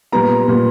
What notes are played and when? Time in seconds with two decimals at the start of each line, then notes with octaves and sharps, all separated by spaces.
0.12 A#2 G3 B3 A#5
0.48 A#2 G3 B3